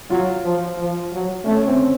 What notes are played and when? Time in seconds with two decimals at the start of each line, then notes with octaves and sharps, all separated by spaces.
0.10 F#3 F4
0.44 F3
0.78 F3
1.12 F#3
1.45 A3 C#4
1.67 C4